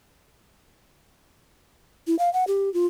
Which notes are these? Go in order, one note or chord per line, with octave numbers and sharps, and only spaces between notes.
E4
F5
F#5
G4
F4